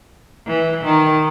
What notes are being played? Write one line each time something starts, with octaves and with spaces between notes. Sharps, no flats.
E3
D#3